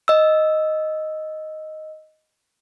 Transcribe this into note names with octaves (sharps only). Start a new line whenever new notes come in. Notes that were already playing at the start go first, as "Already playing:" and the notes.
D#5 E6